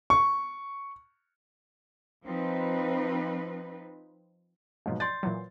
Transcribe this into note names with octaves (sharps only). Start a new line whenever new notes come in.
C#6
F3 C4 D#4 B4
G#2 B2 F3 F#3
D5 C6 G6 A6
A#2 E3 F#3